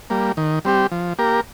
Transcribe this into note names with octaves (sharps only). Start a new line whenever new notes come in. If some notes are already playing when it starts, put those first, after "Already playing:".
G3 A#3
D#3
G3 C4 G4
F3
A#3 G4 A#4